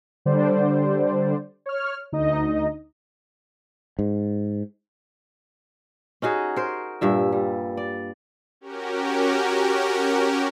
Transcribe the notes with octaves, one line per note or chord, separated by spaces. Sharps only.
D3 G3 C5 D5
C#5 F6
D2 D#4 D#5
G#2
C#4 D#4 F#4 G#4
A#4 C5
G2 A#2 E5
G3
D5
C#4 F#4 G4 A#4